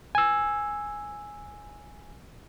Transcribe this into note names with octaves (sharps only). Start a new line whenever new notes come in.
G#5 E6